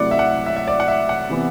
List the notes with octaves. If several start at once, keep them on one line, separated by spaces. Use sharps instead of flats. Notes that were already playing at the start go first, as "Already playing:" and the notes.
Already playing: C3 F#3 A3 E4 D5 F#5
E5
F#5
E5
E5
D5
F#5
E5
F#5
C3 E3 B3 E4